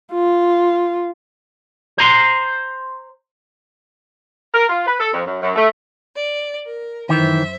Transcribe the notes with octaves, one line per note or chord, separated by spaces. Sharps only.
F4
C5 A#5 C6
A#4
F4
B4
A4
F2
F#2
F#2
A3
D5
A#4
F#2 D#3 E3 C5 E5